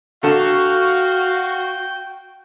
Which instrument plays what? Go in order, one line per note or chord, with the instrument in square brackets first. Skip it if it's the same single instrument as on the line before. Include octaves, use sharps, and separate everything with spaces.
[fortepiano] D3 A4 [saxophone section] F#4 [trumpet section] F5 [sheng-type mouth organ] G5